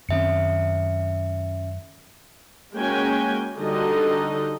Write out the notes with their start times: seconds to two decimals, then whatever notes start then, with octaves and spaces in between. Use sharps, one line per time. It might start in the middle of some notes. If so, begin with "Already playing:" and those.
0.09 F#2 D#3 C4 C#4 E5 C#7
2.74 G#3 A#3 C#4 F#4 G5 G#5
3.57 D3 G3 D#4 F#4 A4 D#5